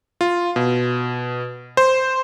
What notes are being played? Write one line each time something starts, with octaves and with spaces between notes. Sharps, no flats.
F4
B2
C5